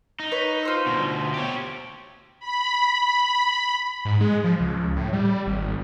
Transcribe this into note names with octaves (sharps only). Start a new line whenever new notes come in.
D#4
B4 C#5
F4 C5 E6
D2 B2
G4 C#5
B5
G#2
G#3
F3
C#2
A2
G3
G#1